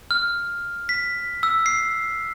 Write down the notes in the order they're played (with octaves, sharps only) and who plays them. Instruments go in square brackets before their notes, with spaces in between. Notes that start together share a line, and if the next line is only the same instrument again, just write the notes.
[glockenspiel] F6
B6
E6
C7